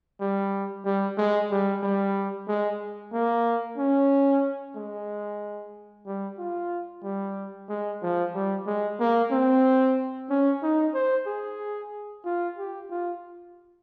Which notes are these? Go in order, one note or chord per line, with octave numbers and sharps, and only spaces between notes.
G3
G3
G#3
G3
G3
G#3
A#3
C#4
G#3
G3
F4
G3
G#3
F3
G3
G#3
A#3
C4
C#4
D#4
C5
G#4
F4
G4
F4